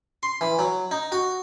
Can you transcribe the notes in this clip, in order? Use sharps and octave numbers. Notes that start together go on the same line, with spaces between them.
C6
E3
F#3
D#4
F#4